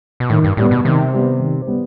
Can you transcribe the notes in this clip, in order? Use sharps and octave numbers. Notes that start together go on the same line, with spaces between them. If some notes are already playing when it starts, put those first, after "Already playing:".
B2
A2 D#3
G2
A2 G3 B3
B2
C3 D#3
G3 B3
D#3
G3 B3